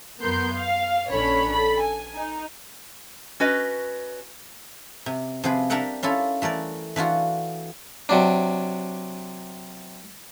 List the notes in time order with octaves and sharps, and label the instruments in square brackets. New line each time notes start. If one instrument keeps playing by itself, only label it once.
[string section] F#2 B3 A#4 C6 G6
F5
A#1 C#4 D4 A4 C#5 B5
A4 B5
G#5
D#4
[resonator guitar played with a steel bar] C#4 F#4 B4 D#5
[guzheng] C3
C3 F3 C4 G#4 B4
D4 G4 A#4 E5 F#5 G5
C#4 E4 F4 A4
E3 A3 A#4 D5
E3 D4 F4 F#4
[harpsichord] C3 F#3 D4